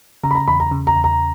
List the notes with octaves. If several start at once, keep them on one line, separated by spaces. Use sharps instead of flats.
C#3 A#5
B5
A#5
E2 B5
A#5
C#3
A#5
E2
A#5